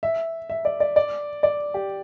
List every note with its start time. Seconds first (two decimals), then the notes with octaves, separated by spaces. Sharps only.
0.03 E5
0.50 E5
0.65 D5
0.80 D5
0.96 D5
1.43 D5
1.74 G4